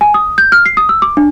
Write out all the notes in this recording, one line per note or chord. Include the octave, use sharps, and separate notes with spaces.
G#5
D#6
G6
F6
C7
D#6
E6
D6
D4